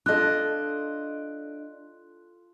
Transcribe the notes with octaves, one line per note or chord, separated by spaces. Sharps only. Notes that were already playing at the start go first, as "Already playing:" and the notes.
D4 F4 A4 D#5 F#6